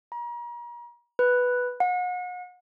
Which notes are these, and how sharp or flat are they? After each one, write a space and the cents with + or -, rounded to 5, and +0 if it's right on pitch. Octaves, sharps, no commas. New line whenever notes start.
A#5 +40
B4 +0
F#5 -40